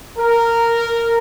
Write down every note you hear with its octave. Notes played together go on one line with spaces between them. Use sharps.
A#4